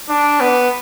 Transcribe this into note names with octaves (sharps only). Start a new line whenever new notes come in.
D4
B3